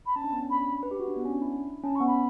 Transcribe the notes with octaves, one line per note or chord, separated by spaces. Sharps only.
B5
C#4 A5
D4
B3
C#4
D4 B5
B4
G4
F#4
D4
B3
C#4
D4
E4
C#4 A5
C#6
B3
B5